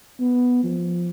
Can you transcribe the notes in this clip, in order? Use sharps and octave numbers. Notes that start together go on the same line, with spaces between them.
B3
F3